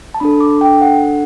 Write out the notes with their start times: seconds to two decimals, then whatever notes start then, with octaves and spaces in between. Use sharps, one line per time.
0.14 A5
0.20 D4 A4 B5
0.41 D6
0.61 G5
0.81 F#5